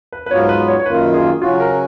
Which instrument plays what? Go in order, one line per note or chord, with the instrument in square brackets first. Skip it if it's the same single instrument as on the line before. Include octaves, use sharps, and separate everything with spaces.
[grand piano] B4
B4
[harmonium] G#2 F#3 B3 F4 [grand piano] C#5
[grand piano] B4
C#5
C#5
[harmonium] F#2 D#3 A#3 F4 [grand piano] B4
[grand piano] G#4
[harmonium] C#3 F#3 C#4 F#4 [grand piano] F4
[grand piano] A#4